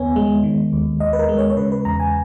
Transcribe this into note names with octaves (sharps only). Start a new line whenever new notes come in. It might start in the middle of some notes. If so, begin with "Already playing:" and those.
Already playing: D#2 C#3 B3 C#5 G#5
G#3
D#3
D#2
D#2 D#5
B4
A#4
G#3
C#5
C#5
C#3 B4
B4
E2 A#5
G#5